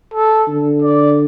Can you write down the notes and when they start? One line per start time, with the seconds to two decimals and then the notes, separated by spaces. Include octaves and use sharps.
0.14 A4
0.48 D3
0.82 D5